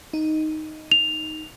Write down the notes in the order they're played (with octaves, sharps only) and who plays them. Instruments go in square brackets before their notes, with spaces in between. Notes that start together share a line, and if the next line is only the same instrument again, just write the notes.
[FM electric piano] D#4
[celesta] F7